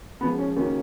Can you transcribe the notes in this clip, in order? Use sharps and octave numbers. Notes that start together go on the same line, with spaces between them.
F#2 F3 G#3 B3
C#4
D#2 C#3 F#3 A#3 C#4